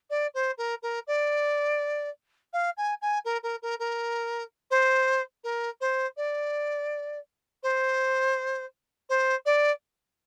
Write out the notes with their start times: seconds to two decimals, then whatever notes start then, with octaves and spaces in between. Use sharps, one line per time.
0.10 D5
0.34 C5
0.58 A#4
0.83 A#4
1.07 D5
2.53 F5
2.77 G#5
3.02 G#5
3.25 A#4
3.43 A#4
3.63 A#4
3.80 A#4
4.71 C5
5.44 A#4
5.81 C5
6.17 D5
7.63 C5
9.09 C5
9.46 D5